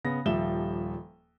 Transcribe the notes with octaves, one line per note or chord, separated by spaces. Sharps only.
C#3 B3 A#6
D#1 F3 G3 E5 E7 G7